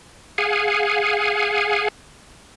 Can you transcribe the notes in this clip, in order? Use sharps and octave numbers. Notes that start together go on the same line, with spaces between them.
G#4 F5 F#5 G#5